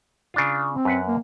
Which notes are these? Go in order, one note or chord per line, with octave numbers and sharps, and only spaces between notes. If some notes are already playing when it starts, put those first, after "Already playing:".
C#3 D4 F4
C4
F#2 B4 F#5
A#3